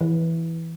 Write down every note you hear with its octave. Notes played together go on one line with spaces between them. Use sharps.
E3